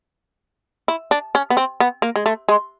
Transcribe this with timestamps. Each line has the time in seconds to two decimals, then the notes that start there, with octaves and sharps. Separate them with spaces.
0.88 E4
1.11 D4
1.35 C#4
1.50 B3
1.57 C4
1.80 B3
2.02 A#3
2.16 G#3
2.26 A3
2.49 G#3